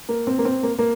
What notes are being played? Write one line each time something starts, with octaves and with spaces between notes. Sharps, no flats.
A#3
C4
A#3
C4
A#3
A#3